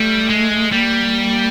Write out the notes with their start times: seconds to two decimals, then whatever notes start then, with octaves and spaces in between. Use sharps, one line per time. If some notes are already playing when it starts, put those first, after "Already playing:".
Already playing: G3 A3
0.29 G#3
0.72 G3 A#3